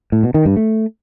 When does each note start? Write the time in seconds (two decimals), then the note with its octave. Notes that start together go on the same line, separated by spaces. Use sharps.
0.12 A2
0.23 B2
0.34 D#3
0.45 G2
0.57 A3